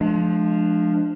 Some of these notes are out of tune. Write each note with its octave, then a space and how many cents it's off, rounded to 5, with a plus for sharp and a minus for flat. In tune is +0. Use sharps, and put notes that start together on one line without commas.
F3 +0 G#3 +35 D4 +20